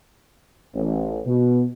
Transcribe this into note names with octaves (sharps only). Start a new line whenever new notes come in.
A1
B2